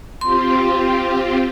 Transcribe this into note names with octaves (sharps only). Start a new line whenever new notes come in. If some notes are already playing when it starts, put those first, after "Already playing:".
C4 F4 G4 C6